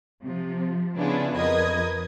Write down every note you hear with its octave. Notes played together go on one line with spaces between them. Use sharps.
C3 F3
C#3 B3 D4 E4 F4 G#4
F2 A#4 B4 D#5 D#6 G#6